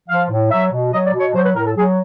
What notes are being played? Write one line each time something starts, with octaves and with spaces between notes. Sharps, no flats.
F3 F5
A2
F#3 E5
B2
F#3 D#5
D5
B2
C#5
F#3 C5
B4
A2 A#4
A4
F#3 G#4